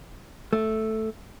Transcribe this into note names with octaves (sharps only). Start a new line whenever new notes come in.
A3